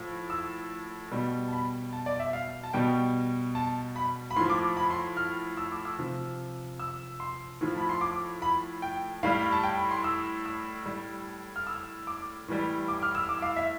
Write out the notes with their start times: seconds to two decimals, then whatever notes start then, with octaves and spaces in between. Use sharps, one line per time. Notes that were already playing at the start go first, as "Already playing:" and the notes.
Already playing: A2 F3
0.30 E6
1.12 B2 G3
1.48 A5
1.53 B5
1.93 A5
2.06 D5
2.20 E5
2.33 F5
2.63 A5
2.73 B2 G3 G5
3.55 A5
3.96 B5
4.31 B5
4.36 A2 C6
4.41 F3
4.50 D6
4.77 B5
4.90 C6
5.17 F6
5.57 E6
5.72 D6
5.85 E6
5.99 C3 F3
6.79 E6
7.20 C6
7.61 A2 F3
7.77 B5
7.89 C6
8.01 D6
8.42 B5
8.82 G5
9.23 A2 G3 F5
9.42 B5
9.52 A5
9.63 G5
9.78 B5
9.91 C6
10.04 E6
10.45 E6
10.86 A2 G3
11.56 F6
11.67 E6
12.07 D6
12.48 A2 E3 G3
12.88 D6
13.02 F6
13.15 E6
13.29 D6
13.42 F5
13.56 E5